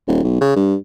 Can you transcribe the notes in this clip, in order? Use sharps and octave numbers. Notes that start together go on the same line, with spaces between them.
D#1
B1
C#3
G2